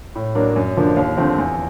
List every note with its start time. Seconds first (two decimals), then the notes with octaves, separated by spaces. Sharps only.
0.15 A2
0.35 F#3 A#3 D4
0.56 F#2
0.77 D3 F3 A#3 D4
0.97 D#2
1.17 D3 F3 A3 C4
1.38 E2